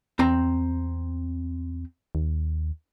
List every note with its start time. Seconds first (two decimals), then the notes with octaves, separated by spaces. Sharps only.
0.19 E2 C4 A#5
2.15 D#2